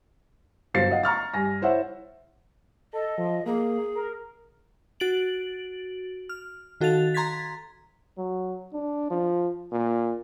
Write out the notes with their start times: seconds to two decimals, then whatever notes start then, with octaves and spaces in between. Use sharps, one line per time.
0.74 G1 F#3 C5 F5 A6 C7
0.91 D#5 F5 F#5
1.03 A#5 C#6 F6 A6
1.34 G2 G#5 A#6
1.62 E4 C5 C#5 E5 F#5
2.93 A4 D#5
3.18 F3
3.46 A#3 G#4
3.95 A#4
5.00 F#4 A6 D7 F#7
6.29 F6
6.81 D#3 F#4 A4 F5 A6 F7
7.14 A#5 C6 G#6 A6 B6
8.17 F#3
8.73 D4
9.10 F3
9.72 A#2